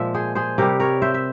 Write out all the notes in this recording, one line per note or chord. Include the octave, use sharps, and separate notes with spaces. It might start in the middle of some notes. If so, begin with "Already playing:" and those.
Already playing: A#2 F3 G#3 E5
G#4 C5
G#4 C5
C3 G3 G4 A#4
A#4 C#5
C5 E5
E5